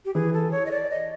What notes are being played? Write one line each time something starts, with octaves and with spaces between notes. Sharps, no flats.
G4
E3 G#4
A4
C#5
D#5
D5
D#5